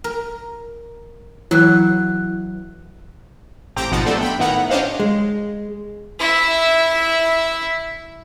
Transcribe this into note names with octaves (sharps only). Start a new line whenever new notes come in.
A#4
E3 F#3 E4 F#6
A1 C4 G4 G5 A#5 D6
G#1 B2 F3 D#4 F#5 A6
F#3 A3 B3 D4 A4 C5
G5 B5
A2 D#3 B3 E4 F#5 A#5
C#4 D4 G4 C5 D#5 F5
G#3
E4 E5